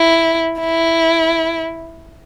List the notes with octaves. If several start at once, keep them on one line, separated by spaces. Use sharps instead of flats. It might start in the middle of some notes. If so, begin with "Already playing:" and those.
Already playing: E4
E4